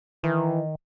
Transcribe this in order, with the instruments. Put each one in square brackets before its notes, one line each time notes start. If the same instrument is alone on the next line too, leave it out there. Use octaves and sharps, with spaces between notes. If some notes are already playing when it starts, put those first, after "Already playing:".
[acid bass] D#3 [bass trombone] E3